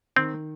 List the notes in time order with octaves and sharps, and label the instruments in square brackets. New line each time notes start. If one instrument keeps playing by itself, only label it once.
[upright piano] D#3 [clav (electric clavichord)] C4